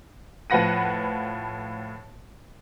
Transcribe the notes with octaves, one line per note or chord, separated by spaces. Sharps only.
A2 F3 B4 F#5 A#6 D#7